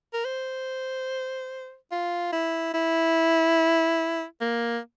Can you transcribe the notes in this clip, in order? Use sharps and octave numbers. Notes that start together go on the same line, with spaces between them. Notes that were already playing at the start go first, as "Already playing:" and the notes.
A#4
C5
F4
E4
E4
A#3